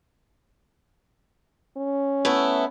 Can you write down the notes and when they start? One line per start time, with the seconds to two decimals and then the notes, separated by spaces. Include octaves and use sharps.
1.77 C#4
2.25 A3 B3 E4